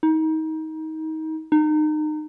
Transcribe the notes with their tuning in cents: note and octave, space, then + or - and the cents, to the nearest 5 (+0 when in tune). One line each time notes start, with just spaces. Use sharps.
D#4 +25
D#4 -30